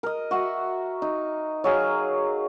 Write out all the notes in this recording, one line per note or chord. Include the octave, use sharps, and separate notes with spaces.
A#4 D#5
F#4 E5 F#5
D#4
F#3 G#4 F5